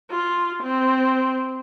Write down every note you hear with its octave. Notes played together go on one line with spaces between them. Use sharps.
F4
C4